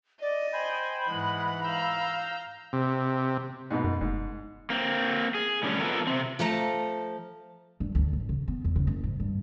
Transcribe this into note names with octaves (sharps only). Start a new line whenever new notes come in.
D5 D#5
C5 G5 G#5 B5
G#2 E3 G#3 F#5
F5 A#5 E6 G6
C3
G#2 B2
F#2
F1 G#2
A#3 C4
G#4
A2 D3 G3 C#4
F3 G3 B3 A4 A#4
C3 C4
F3 A3 A5 A#5
G2
D2
A1
C#3
B3
E2
C#3
F#1
G#2
G2